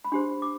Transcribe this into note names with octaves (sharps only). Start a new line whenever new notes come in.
B5
D4 G4 C5 C6
D6